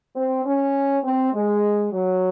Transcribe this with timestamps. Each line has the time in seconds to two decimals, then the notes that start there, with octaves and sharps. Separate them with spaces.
0.15 C4
0.45 C#4
1.03 C4
1.33 G#3
1.92 F#3